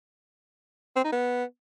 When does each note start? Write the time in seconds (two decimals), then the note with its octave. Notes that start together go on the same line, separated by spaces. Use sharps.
0.96 C4
1.04 D#4
1.12 B3